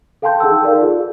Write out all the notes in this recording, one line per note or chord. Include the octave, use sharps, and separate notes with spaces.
A4 F5 G5 A5 C6 G6
D#4 G#4 A4 F#5 A5 E6
A#4 D5 F5
F4 G#4